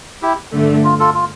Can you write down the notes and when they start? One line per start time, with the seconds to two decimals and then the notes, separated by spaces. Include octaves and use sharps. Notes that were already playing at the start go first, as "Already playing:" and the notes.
0.22 E4 G4
0.53 G2 D3 A3
0.84 F4
0.99 F4 A4
1.14 F4